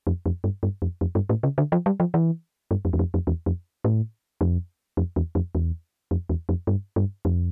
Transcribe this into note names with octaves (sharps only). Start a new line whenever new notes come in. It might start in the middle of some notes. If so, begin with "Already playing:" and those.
F2
F2
G2
G2
F2
F2
G2
A2
C#3
D3
F3
G3
F3
E3
G2
F2
E2
F2
F2
E2
F2
A2
F2
F2
E2
F2
E2
F2
E2
F2
G2
G2
F2